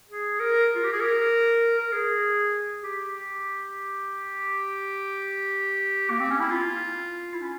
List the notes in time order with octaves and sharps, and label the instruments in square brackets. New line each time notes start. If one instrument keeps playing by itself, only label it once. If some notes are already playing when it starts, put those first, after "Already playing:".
[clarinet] G#4
A#4
F4
G4
G#4
A#4
A#4
G#4
G4
A#3
C4
C#4
E4
F4
E4
C#4